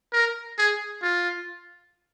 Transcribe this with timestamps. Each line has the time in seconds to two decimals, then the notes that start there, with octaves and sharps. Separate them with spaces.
0.13 A#4
0.58 G#4
1.03 F4